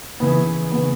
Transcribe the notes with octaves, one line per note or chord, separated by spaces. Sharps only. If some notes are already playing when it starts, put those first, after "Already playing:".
C#3 E3 B3 C#4 E4
B3
C#3